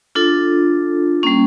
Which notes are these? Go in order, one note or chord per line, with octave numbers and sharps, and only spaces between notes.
D4 F4 A4
G3 A#3 C#4